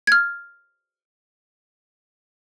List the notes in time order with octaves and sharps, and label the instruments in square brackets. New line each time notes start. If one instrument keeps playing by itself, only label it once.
[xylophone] F6 G#6